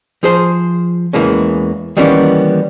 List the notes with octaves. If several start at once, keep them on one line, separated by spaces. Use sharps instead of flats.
F3 G#4 C5
E2 G2 E3 G#3 A#3 C#4
D#3 E3 G3 A#3 B3 C#4